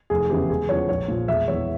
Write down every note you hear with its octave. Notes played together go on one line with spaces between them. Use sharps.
F1 G#4
E2 C#3 E3 G4
E1 G#4
E2 C#3 F3 C#5
A#1 C#5
A#2 F3
E1 E5
E2 E3 C#5